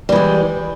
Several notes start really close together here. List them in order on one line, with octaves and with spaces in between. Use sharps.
G3 E3 G#3